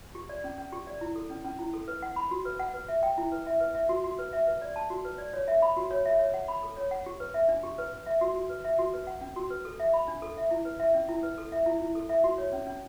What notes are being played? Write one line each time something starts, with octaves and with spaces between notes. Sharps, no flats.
G4
D5
C#4
C#4
G4
D5
E4
A4
C#4
C#4
E4
A4
B4
F#5
B5
F#4
B4
F#5
B4
E5
G5
E4
B4
E5
B4
E5
F#4
F#4
B4
E5
B4
D5
A5
F#4
B4
D5
C#5
E5
B5
F#4
C#5
E5
C#5
F#5
B5
A4
C#5
F#5
G4
B4
E5
D4
G4
B4
B4
E5
F#4
F#4
B4
E5
F#4
B4
F#5
C#4
F#4
B4
A4
E5
B5
D4
A4
E5
E4
B4
E5
C#4
E4
B4
A4
E5
E4
E4
A4
E5
F#4
C#5
C#4
C#4